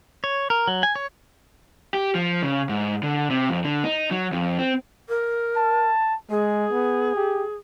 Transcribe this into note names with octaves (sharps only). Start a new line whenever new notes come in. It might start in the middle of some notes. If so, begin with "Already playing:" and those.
C#5
A#4
F#3
G#5
C#5
G4
F3
C#3
G#2
D3
C3
F2
D3
D#4
F#3
F2
C4
A#4
A5
G#3 G#4
B3
G4